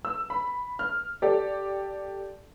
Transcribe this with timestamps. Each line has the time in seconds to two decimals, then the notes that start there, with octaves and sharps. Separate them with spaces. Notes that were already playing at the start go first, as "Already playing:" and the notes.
0.05 E6
0.30 B5
0.79 F6
1.22 G4 A4 D5